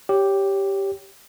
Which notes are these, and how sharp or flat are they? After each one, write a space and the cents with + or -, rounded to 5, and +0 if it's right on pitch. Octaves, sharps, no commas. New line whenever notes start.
G4 +0 C#5 +10